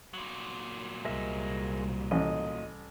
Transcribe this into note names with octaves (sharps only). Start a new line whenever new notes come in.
A#2 F#3
C2 G#3 A#4 E5
A1 D#5